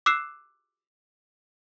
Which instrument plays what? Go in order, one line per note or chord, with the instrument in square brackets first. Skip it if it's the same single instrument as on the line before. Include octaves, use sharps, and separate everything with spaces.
[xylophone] D6 E6 F#6 C7 E7